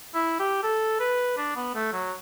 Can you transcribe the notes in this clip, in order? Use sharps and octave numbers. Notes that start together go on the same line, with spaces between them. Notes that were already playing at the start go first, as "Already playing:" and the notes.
E4
G4
A4
B4
D4
B3
A3
F#3